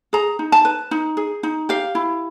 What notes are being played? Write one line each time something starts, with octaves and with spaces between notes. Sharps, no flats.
G#4 A#5
D#4
A5
B4
D#4
G#4
D#4
G4 F5
E4